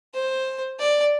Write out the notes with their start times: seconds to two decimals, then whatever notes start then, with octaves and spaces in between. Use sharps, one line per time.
0.14 C5
0.79 D5